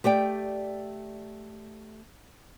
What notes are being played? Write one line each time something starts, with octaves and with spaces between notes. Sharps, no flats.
A3 G4 D5 G5